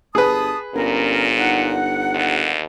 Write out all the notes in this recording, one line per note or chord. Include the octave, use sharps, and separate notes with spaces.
G1 G#4 B4 A5 D#6
G1 A#2 C#4 A#4
D#4 F#5
D#2